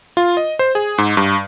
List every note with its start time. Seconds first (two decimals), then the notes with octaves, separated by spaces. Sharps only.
0.17 F4
0.37 D#5
0.59 C5
0.75 G#4
0.98 G#2
1.17 G2